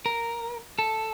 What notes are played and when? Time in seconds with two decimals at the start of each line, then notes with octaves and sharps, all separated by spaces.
0.06 A#4
0.79 A4